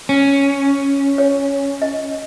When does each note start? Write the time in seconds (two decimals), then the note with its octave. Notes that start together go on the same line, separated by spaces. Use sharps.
0.09 C#4
1.18 C#5
1.82 D#5